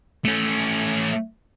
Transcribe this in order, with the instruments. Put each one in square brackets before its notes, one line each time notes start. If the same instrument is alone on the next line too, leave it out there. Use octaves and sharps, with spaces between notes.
[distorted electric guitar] A3 C#4